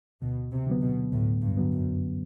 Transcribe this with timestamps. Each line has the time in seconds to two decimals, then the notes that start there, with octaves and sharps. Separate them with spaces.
0.21 D2 B2
0.52 C3
0.67 D3 F#3 B3
0.82 B2
1.12 D2 A2
1.42 G2
1.57 D3 F#3 B3
1.72 F#2